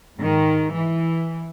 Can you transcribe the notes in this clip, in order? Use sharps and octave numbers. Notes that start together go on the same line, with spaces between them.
G#2 D#3
E3